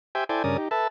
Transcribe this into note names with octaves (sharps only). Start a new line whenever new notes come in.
G4 C5 E5 G5 G#5
E4 A4 C5 D5 G5 G#5
G2 C#3 C#4 A#4 D5 D#6
D#4 G4
A4 B4 E5 A5